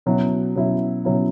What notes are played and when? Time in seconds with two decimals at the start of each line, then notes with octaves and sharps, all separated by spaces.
0.06 B2 F#3 C#4 E4
0.56 B2 F#3 C#4 E4
1.05 B2 F#3 C#4 E4